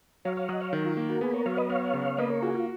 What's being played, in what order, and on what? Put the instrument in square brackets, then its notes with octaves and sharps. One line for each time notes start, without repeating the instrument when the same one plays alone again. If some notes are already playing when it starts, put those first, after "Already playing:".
[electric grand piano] F#3 [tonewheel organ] C#5 F5
[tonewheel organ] C#5 F5
[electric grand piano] F#3 [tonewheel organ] D#5 F#5
[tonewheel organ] C#5 F5
[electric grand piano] D#3
[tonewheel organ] F4
[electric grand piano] A#3
[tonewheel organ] F#4 A#4
[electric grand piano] B3 [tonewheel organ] G#4 B4
[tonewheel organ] A#4 C#5
[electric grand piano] F#3 [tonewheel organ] C#5 F5
[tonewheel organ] B4 D#5
[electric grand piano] B3 [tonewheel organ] C#5 F5
[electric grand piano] C#3
[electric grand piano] A#3 [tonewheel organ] B4 D#5
[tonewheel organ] A#4 C#5
[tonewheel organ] F4 G#4 [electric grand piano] F#4
[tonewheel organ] F4